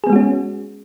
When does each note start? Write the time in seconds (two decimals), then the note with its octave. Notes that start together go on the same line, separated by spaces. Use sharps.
0.04 G#4
0.07 B3
0.10 G#3
0.13 F#4
0.16 C#4